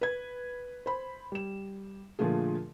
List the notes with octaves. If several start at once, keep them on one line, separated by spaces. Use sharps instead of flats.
B4 G#6
C5 B5
G3 E7
A#2 D3 F3 A3 F4 G#4